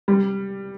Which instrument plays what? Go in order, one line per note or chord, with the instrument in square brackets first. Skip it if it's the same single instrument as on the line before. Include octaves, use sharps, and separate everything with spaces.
[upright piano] G3